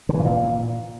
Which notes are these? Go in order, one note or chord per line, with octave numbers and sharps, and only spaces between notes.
D3
E3
A2
A#2